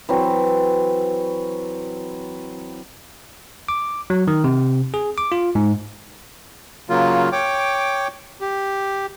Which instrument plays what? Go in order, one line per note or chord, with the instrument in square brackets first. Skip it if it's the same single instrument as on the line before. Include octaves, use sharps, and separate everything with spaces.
[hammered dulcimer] E3 F#3 C4
[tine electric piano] D6
F#3
D#3
C3
G#4
D6
F4
G#2
[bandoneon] C#3 F#3 A#3 F4
C#5 G5 D6
G4